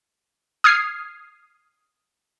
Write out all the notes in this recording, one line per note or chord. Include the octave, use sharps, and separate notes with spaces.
D#6 F6 G#6 C7